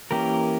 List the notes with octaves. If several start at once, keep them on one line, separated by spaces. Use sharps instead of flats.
E3 A#3 C#4 G4 A#4